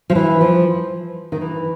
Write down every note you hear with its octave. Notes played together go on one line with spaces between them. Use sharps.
F3
E3
F3
D#3
E3